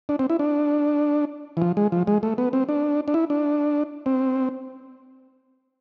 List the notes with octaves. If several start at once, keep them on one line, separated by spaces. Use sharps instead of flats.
D4
C4
E4
D4
E3
F3
G#3
F3
G#3
A3
B3
C4
D4
D4
E4
D4
C4